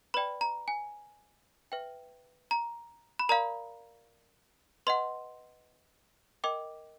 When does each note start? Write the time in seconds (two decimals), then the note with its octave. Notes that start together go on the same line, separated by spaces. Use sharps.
0.14 B4 D5 G5 B5
0.41 A#5
0.68 G#5
1.72 B4 E5 G5
2.51 A#5
3.19 B5
3.29 A#4 D5 F5 A#5
4.87 B4 D#5 F#5 C6
6.44 A#4 D#5 G5 D6